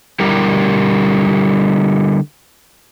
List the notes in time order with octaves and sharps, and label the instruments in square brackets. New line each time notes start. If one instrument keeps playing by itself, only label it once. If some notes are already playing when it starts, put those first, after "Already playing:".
[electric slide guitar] D3 G3 E4 G4 A#4